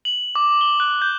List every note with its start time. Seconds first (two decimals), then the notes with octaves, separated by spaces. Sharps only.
0.05 F#7
0.35 D6
0.61 G7
0.80 F#6
1.02 G6